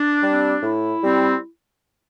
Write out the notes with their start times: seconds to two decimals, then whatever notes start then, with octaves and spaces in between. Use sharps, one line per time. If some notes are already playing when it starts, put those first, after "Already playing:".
Already playing: D4
0.23 G3 C4
0.63 A2 E4
1.03 G3 C4